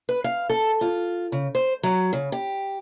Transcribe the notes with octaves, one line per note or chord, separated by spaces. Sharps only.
B4
F5
A4
F4
C#3
C5
F#3
C#3
G4